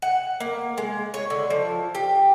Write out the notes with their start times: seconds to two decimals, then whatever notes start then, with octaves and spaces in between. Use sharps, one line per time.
0.02 F#5
0.40 A#3
0.78 G#3
1.14 C#5
1.30 D3
1.50 F3
1.95 G4